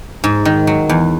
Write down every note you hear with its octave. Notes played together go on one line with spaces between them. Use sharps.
G#2
D#3
F#3
E2